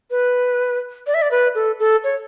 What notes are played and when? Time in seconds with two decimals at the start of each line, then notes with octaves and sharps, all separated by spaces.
0.11 B4
1.07 D5
1.14 E5
1.22 D5
1.31 B4
1.55 A4
1.80 A4
2.04 C#5